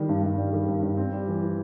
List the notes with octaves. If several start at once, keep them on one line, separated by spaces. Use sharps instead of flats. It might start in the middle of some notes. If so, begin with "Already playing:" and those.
Already playing: D#3 G3
G2
G2
G3
D#3
G2
G2
C4
G3
E3
E3